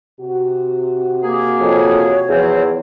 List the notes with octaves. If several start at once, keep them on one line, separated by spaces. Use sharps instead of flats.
C3 F#4
A#3 G#4
F2 C#5
E2 F3 C4